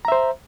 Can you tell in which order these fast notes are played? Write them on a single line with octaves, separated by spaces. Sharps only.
A#5 E5 C5